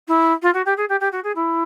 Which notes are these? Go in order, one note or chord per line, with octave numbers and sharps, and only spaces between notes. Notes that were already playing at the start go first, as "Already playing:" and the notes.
E4
F4
F#4
G4
G#4
G4
G4
F#4
G#4
E4